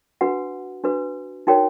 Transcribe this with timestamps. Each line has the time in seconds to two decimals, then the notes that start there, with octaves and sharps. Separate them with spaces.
0.21 D4 F#4 B4 F#5
0.84 D4 F#4 B4
1.47 D#4 F#4 A#4 C#5 G5